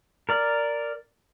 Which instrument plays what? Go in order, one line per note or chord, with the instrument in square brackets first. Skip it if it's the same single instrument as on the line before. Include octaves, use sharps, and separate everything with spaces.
[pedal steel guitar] A#4 D5